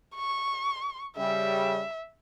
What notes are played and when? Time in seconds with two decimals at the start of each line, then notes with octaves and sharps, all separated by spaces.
0.16 C#6
1.17 C#3 G3 E5